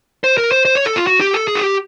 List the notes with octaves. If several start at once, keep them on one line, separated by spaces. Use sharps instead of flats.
C5
A#4
C5
C5
C#5
A4
F4
F#4
G4
A4
G#4
F#4
G4